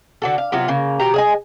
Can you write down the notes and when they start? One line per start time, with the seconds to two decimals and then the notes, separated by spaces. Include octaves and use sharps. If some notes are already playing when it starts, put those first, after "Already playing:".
0.22 D3 F#4 A4
0.38 F5
0.52 C3 F#3 B3 F4
0.68 C#3 A#3
0.99 B2 G4 A#5
1.14 G#4 D#5 G#5